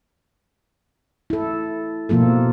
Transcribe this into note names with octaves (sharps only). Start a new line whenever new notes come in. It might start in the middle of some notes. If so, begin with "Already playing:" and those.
E4 A4
B2 F3 A#3 F4 A4